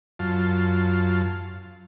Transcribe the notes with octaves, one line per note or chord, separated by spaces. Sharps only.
F#2 F4 A5